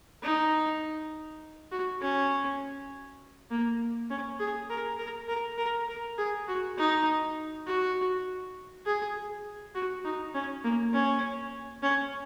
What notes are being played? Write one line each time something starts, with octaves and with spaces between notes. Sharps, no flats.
D#4
F#4
C#4
A#3
C#4
G#4
A#4
A#4
A#4
A#4
A#4
G#4
F#4
D#4
F#4
G#4
F#4
D#4
C#4
A#3
C#4
C#4